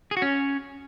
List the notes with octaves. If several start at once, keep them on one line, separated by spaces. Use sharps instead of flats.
G#4
F#4
C#4